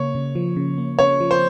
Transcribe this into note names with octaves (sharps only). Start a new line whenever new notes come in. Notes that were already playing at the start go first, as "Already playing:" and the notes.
Already playing: C#3 A#3 C#5
C#3
F3
C#3
A#3
C#3 C#5
F3
C5